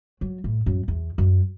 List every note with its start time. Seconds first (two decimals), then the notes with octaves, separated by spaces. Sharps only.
0.21 F#3
0.44 A2
0.66 F#2
0.88 E2
1.18 F#2